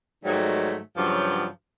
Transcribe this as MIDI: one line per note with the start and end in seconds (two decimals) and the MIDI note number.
0.24 0.78 44
0.24 0.78 51
0.24 0.78 54
0.24 0.78 55
0.24 0.78 57
0.97 1.46 43
0.97 1.46 49
0.97 1.46 53
0.97 1.46 54